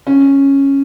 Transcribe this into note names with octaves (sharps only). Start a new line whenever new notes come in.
C#4